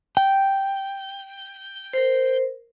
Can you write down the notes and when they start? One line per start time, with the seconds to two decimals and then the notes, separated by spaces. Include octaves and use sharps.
0.17 G5
1.93 A#4 C5